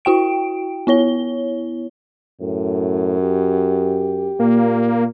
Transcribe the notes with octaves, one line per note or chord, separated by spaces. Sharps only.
E4 F#4 G5 D7
B3 E4 C#5 G7
F#2 A2
G4
A#2 A#3